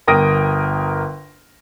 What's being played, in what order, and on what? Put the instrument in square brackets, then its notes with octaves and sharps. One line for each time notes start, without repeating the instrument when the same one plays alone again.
[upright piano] G1 A#4 G5 D#6 A#6 D7